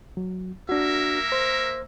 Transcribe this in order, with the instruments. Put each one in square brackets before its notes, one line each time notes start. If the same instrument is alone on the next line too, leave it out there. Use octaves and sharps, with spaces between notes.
[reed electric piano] F#3
[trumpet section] A#3 A#4 E5 [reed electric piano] D4 F#4
[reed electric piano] C5